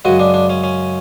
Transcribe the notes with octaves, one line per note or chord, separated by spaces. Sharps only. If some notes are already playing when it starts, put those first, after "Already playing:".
F#2 C#3 G#3 F#4
D4
D4
C#4
C#4